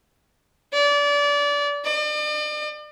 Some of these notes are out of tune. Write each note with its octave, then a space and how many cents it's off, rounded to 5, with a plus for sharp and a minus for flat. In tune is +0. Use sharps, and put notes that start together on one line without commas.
D5 -25
D5 +45